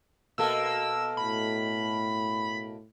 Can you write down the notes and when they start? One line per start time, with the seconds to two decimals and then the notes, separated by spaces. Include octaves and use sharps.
0.38 B2 A#3 A4 E6
1.17 A2 B5